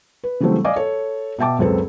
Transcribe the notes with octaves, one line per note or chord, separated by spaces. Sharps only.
B4
C#3 E3 F#3 G3 A3 C4
D5 D#5 F5 G#5 D6
A4 C#5
B2 E5 G5 A5 D6
C#2 F#2 C4 A4 B4